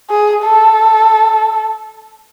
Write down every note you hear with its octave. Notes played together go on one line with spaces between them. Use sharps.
G#4
A4